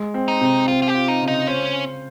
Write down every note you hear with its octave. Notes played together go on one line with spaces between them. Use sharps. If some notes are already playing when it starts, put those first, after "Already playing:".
Already playing: G#3
C4
D#4
C3
C4 F4
F4
G4
F4
D#4
C#3
D#4
C#4 C5